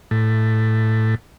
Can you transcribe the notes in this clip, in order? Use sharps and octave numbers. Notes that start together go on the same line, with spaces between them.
A2